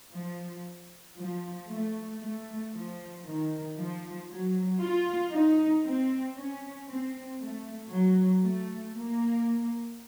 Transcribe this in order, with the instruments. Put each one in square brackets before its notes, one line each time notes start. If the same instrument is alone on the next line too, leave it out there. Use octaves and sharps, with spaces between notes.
[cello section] F3
F3
A3
A3
F3
D#3
F3
F#3
F4
D#4
C4
C#4
C4
A3
F#3
A3
A#3